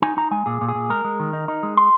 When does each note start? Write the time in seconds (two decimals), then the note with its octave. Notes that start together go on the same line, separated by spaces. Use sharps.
0.02 D#4 G#5
0.17 D#4 A#5
0.31 G#3 G#5
0.46 A#2 G#4
0.61 A#2
0.68 G#4
0.75 A#2
0.89 G#3 A#4
1.04 G#3
1.20 D#3
1.33 D#4
1.48 D#4
1.63 G#3
1.77 C6